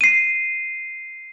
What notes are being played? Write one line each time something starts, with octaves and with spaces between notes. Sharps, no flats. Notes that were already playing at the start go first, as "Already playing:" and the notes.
C7 D#7